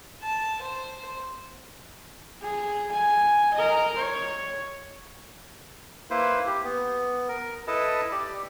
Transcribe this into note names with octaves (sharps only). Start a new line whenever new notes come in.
A5
C5
G#4
G#5
A#4 D#5
C#5
A#3 E4 B4 C5
G4
B3
A#4
E4 A4 B4 D#5 A5
G4 D5